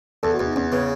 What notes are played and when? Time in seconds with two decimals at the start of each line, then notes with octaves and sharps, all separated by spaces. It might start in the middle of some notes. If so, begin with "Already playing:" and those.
0.23 E2 A4
0.34 F#4
0.39 E2
0.45 D#4
0.56 E2 C#4
0.72 C#3 B3